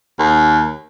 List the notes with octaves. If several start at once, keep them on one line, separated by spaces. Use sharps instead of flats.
D#2